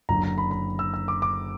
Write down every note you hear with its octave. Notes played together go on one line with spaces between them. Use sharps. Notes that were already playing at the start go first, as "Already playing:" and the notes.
F#1 F#2 D3 F#3 A#5
A#5
B5
B5
E6
E6
D6
D6